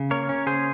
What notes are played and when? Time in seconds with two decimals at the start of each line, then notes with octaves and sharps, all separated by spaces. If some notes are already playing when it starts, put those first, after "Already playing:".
Already playing: C#3
0.11 A#3 A#4 C#5
0.29 C#4
0.46 C#3 G#4 C5